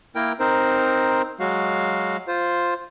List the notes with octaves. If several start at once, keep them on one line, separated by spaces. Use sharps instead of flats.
A#3 E4 A#4 G5
C4 D#4 A#4 C5
F#3 G#3 F#4 F5
F4 C5